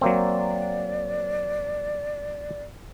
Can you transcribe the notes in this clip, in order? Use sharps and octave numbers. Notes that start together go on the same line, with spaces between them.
F#3 A#3 C4 D5